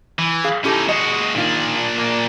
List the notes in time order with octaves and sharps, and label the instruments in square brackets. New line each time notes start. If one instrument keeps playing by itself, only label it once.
[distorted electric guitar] E3
[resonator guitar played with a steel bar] G#4 F5
[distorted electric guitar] C#4 D#4 [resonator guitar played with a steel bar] E4 G4 A4
[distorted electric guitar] G#3 F#4 [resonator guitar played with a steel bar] D#5
[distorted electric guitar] A#2 D4 [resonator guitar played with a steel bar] D#3 F4
[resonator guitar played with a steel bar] A#3